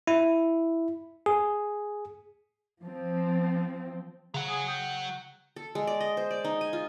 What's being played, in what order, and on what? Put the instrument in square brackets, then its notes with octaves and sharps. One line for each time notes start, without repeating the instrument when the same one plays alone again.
[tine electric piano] E4
G#4
[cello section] F3 C4
[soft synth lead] C#3 [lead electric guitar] F#3 F#5
[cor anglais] G#4
G5
[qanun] A4
G#3
D5
D#5
C5
D5
D#4
G#5
F4